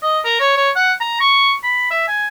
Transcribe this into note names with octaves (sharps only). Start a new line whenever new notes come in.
D#5
A#4
C#5
C#5
F#5
A#5
C#6
B5
E5
G#5